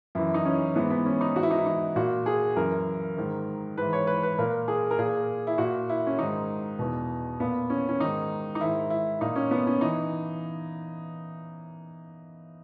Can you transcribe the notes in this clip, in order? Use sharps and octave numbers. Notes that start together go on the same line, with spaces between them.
F#2 E3 E4
D#4
C#4
G#2 E3 B3
B3
C#4
D#4
G#2 E3 E4 F#4
D#4
E4
D#4
A#2 F#4
G#4
F#2 E3 A#4
G#2 D#3
G#2 E3 B4
C#5
B4
B4
A#2 A#4
G#4
A#4
A#2 G#4
E4
A#2 F#4
E4
C#4
G#2 D#3 D#4
E2 B2
A#2 B3
C#4
C#4
G#2 D#3 D#4
D#4
G#2 D#3 E4
E4
A#2 D#4
C#4
B3
C#4
E3 D#4